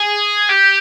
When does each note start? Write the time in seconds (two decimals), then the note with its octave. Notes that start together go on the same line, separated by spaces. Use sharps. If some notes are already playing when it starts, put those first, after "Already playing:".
Already playing: G#4
0.49 G4